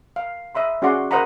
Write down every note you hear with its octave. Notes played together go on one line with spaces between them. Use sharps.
F5
D#5 E5 B5 C6
C#4 F#4 G#4 D5 F#5 C6
A#4 C5 D#5 F#5 A#5 B5